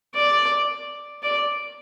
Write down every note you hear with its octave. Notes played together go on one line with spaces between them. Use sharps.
D5
D5